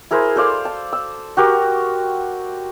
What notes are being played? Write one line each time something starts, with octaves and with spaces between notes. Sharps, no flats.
E4 G#4 A#4 C5
A4 C5 D5 F5
A5
E6
F#4 G4 A#4